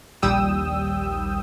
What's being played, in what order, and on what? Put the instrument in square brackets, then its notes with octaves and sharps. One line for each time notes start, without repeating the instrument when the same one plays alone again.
[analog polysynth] A#1 D#2 G3 G5 D#6 E6